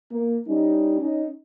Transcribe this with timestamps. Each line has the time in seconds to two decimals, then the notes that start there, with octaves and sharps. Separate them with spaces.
0.12 A#3
0.48 G3 C#4 D#4
1.00 C#4 D#4